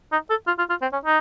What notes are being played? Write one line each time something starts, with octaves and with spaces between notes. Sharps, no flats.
D#4
A4
F4
F4
F4
C4
C#4
D#4